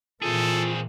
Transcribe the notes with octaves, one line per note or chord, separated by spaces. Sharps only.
A#2 E3 C4 F4 G#4 A4